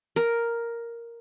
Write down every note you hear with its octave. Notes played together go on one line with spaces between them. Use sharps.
A#4